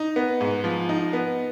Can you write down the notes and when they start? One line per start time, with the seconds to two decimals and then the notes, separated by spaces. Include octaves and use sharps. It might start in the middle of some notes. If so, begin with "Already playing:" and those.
Already playing: D#4
0.16 B3
0.41 G#2
0.64 F3
0.89 D#4
1.13 B3